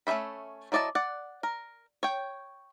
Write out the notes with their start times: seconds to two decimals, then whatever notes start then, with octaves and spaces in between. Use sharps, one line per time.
0.07 A3 C#4 C5 E5 B5
0.72 F#3 E4 D5 D#5 A5
0.95 D5 F#5
1.43 A#4
2.03 C#5 G5